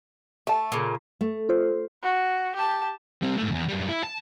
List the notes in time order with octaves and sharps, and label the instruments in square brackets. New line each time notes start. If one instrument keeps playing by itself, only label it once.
[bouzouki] A3 [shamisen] E5 A5
[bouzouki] A#2 C#3
[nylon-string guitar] A3
[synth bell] F4 C5
[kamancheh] F#4
G4 A5
[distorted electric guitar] G3 C4
G#2 A3
E2
F#2 G3
E4
A5